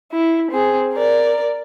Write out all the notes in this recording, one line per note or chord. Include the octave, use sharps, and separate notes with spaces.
E4
C4 G#4
A#4 D5